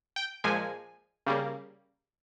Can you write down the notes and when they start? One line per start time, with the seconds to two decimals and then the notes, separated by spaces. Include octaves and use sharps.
0.16 G5
0.44 A#2 F3 G#3 G#5
1.26 C#3 G3 A#3